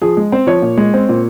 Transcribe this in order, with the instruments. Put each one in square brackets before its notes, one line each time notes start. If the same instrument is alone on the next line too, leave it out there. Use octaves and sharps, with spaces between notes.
[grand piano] F3 G#4
G#3
C4 C5
F3 C#5
A#2
G#3
C4
A#2